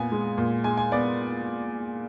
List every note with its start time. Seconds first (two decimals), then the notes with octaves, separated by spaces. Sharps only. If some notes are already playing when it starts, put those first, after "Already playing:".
Already playing: A#2 B3 G#5
0.12 G#3
0.38 A#2
0.64 G#3 G#5
0.77 G#5
0.92 B3 D5